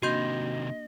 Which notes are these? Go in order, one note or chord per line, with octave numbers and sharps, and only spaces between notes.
C3 D#3 A#3 D4 F#4 D#5 C6 G6